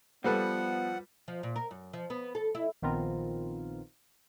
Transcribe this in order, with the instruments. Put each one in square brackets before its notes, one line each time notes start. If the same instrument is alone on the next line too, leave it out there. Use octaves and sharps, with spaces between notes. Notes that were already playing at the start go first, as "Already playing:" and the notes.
[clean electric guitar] F3 [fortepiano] G3 A4 B4 [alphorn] B3 [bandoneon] F#5
[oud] F3
A#2
A#4
F#2
F3
B3
A4
E4
[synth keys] A#1 D#3 B3 C4 F4 A#4